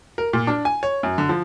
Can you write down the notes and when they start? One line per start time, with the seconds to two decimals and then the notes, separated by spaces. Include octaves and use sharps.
0.18 A#4
0.33 A#2
0.47 D4
0.65 G#5
0.83 C#5
1.03 F#2
1.18 D3
1.29 F3